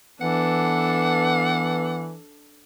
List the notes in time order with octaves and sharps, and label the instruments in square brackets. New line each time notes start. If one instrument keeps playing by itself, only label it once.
[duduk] E3 [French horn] B3 [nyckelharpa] D4 A4 [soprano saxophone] F#5